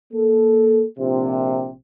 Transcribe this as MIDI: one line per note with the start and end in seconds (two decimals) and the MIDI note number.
0.13 0.85 58
0.13 0.85 69
0.99 1.71 34
0.99 1.71 48